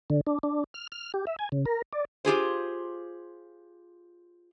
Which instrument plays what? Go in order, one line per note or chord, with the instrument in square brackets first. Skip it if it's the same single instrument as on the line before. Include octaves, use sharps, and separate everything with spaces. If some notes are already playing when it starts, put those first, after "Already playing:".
[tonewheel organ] D3
D4
D4
F6
F6
G4
E5
G#5
C#3
A#4
D5
[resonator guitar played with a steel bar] F4 G4 G#4 C5